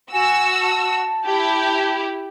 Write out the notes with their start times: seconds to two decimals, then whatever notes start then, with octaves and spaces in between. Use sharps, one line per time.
0.12 F#4 G#5 E6
0.61 A5
1.24 E4 G4